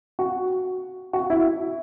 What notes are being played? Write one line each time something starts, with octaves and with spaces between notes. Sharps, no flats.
F#4
F#4
E4